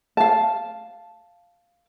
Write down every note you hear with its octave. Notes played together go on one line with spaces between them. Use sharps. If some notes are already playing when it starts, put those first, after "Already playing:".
F5 A5